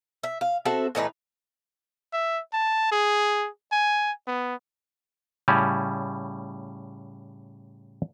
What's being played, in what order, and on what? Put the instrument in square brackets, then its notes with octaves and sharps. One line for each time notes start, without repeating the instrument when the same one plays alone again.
[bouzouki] E5
F5
C4 F#4 A4 E5
A2 E3 D#4 B4
[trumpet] E5
A5
G#4
G#5
B3
[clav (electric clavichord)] A2 C#3 G3 C#4 E4